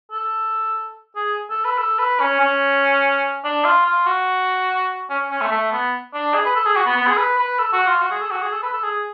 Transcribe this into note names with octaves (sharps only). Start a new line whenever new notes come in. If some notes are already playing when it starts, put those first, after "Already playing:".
A4
G#4
A4
B4
A4
B4
C#4
C#4
D4
F4
F4
F#4
C#4
C#4
A3
A3
B3
D4
G#4
B4
A4
G#4
F#4
B3
B3
G#4
B4
B4
A4
F#4
F4
F#4
G#4
A4
F#4
G#4
A4
B4
A4
G#4